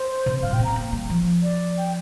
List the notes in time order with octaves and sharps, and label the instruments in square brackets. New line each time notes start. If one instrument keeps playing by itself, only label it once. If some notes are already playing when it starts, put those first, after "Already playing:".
Already playing: [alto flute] C5
[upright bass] C3
[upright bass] G2 [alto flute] F5
[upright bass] A#2
[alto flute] G5
[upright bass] C4
[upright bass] A#3 [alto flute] A#5
[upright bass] A#3
G3
F3
[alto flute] D5
G5